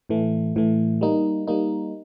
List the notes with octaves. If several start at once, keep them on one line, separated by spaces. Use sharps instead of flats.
A2 E3 A3
A2 E3 A3
G3 A#3 D#4
G3 A#3 D#4